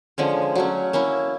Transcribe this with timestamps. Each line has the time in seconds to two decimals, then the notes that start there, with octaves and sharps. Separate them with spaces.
0.18 D3 F3 G#3 C#4
0.56 F#3 A3 C#4
0.93 A#3 C#4 E4